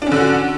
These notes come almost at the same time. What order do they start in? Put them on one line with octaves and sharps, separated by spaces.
D4 C#4 D3 F#4